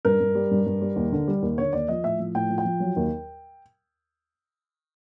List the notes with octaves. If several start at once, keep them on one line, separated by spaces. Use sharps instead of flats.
G2 A#4
G2
G3
G2
G2
G3
D#2
D3
G3
D#2
D3 C#5
D#2 D5
F3 D#5
A2 E5
F3
A2 G5
F3
G5
F3
F#3
D#2